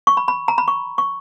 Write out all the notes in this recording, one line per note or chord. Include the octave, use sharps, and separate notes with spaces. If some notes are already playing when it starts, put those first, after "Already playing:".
C#6
B5
B5
A#5
B5
C#6
C#6